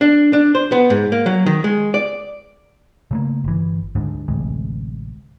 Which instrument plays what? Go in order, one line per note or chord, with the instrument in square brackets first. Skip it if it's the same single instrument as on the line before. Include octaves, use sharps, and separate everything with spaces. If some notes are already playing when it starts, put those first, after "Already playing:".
[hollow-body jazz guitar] D4
D4
C5
B3
G#2
A#3
F#3
D#3
G#3
D5
[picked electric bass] C#3 A3 A#3
G1 E3
D2 G#2 D3 G#3
A1 D2 C3 G#3